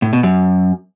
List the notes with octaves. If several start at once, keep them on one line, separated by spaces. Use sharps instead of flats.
A2
B2
F#2